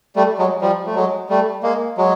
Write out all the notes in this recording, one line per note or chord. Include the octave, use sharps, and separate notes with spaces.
G3 A3
F#3 G#3
F3 G3
A3
F#3 G#3
G3 A3
G#3 A#3
F#3 G#3